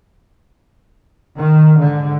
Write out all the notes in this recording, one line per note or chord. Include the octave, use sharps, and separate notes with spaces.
D#3
G#2 D3